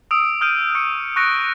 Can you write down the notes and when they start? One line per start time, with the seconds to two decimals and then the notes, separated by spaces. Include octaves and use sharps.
0.11 D#6 E6 D7
0.41 D#6 F6 G6 D7 D#7
0.75 C#6 F6 C#7
1.16 C#6 F#6 A#6 C#7 D7